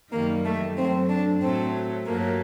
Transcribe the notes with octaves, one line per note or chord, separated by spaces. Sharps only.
F#2 D#3 G3 A#3
A3
F#2 F#3 A3 C4
D4
A2 F#3 A3 C4
G2 F#3 A3 A#3